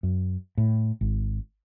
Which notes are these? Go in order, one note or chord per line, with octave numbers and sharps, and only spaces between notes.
F#2
A2
G#1